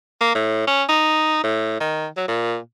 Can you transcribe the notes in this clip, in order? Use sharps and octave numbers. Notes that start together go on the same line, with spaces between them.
A#3
A2
C#4
D#4
A2
D#3
F#3
A#2